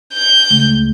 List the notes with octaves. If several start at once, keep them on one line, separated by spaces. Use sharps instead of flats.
G6
C#2 A3